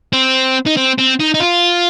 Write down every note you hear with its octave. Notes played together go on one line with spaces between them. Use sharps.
C4
D#4
C4
C4
D#4
D#4
F4